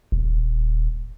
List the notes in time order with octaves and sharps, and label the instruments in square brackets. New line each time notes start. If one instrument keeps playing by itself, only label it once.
[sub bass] D#1